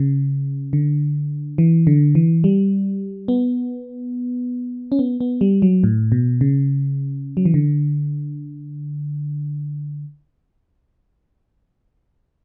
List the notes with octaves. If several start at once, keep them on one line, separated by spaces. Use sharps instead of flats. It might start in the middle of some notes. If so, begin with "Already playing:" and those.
Already playing: C#3
D3
E3
D3
E3
G3
B3
C#4
B3
B3
G3
F#3
A2
B2
C#3
F#3
E3
D3